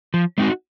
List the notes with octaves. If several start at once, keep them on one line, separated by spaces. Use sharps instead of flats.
F3
G#3 C4 D#4 F#4